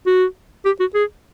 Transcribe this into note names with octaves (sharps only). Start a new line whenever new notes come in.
F#4
G4
F#4
G#4